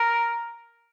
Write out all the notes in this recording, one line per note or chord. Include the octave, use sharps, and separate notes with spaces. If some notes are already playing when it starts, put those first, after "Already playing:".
Already playing: A#4